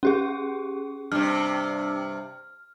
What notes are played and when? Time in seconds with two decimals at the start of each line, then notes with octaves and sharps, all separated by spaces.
0.03 C#4 G4 G#4
1.12 G2 C3 F6